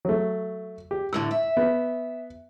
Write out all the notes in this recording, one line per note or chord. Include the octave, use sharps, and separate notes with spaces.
F#3 A3
G4
E2 A2 D3 E6
E5
B3